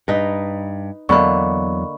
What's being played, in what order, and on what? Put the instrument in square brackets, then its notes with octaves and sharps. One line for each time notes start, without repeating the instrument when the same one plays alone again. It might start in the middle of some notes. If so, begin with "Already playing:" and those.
[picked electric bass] G2 [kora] D#4 B4
[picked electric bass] E2 F#3 B3 [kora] D3 A#3 [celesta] D#5 B5 C#6